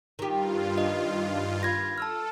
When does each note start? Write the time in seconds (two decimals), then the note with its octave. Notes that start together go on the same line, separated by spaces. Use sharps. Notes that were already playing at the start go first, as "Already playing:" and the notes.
0.19 G2 D#3 F4 G4
0.78 D#5
1.63 B5 G#6 A#6
1.98 A4 A5 E6 F6